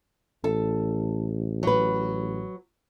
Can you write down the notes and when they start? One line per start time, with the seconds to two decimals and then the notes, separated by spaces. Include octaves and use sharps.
0.44 A1 A4
1.63 F#3 B4